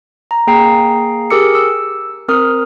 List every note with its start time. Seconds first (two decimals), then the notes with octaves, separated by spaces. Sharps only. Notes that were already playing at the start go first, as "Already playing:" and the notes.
0.31 A#5
0.47 A#3 G#4 G5 A#5 C7
1.30 G4 G#4 A#4 D6 E6 C#7
1.55 E6
2.28 C4 A#4 D#6 F6